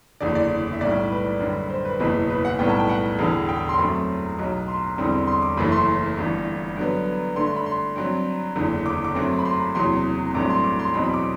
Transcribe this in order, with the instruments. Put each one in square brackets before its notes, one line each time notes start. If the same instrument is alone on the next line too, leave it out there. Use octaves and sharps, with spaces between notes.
[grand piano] F#1 E2 D3 D5
D5
E5
B1 A2 G3 D5
B4
F#2 D3 G3
C5
B4
F#1 E2 B2 B4
B4
F#5
B1 A2 G3 B3 G5
A5
G5
F#5
E1 E2 D3
G5
C6
F#2 F#3 A3 C4 B5
B1 B2 F#3
C6
E1 E2 D3 G3 C4
C6
D6
F#1 F#2 E3 A3 B5
C6
G1 G2 E3
G2 D3 F#3 B3
G2 D3 A3 C6
C6
B5
C6
G2 F#3 C4
F#1 E2 D3
D6
D6
F#2 F#3 A3 C4
B5
C6
B5
F#1 E2 C3 F#3 C6
A1 G2 F#3 A3 C4 D6
C6
D6
C6
E2 B2 F#3 C4 B5
B5
D6